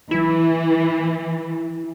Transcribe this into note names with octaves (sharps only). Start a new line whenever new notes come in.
E3 E4